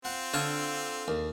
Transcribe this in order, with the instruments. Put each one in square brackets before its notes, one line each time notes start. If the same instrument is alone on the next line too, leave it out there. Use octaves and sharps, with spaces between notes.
[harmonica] C4 F4 [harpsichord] F#5
[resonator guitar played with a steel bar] D3 [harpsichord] C#5 F5 A5
[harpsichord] D#2